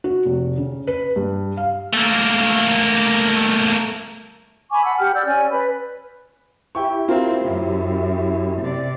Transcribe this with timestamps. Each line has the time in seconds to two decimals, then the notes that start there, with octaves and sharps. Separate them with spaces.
0.04 F#4
0.25 F1
0.57 C#3
0.87 B4
1.16 G2
1.57 F5
1.93 A3 A#3
4.70 G#5 B5 C#6 D6
4.83 F#5 A5 B5 E6
4.98 G4 F#5 G5 F6
5.14 D5 E6 F6 G6
5.25 C#4 D5 G#5
5.50 B4 B5
6.75 E4 G4 G5 C#6
7.09 C4 F4 A#4 C5
7.45 F#2
8.62 C3 D5